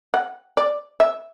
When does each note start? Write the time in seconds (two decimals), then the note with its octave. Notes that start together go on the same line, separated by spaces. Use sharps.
0.14 F#5
0.57 D5
1.00 E5